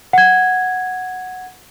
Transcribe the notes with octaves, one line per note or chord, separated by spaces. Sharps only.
F#5 G#6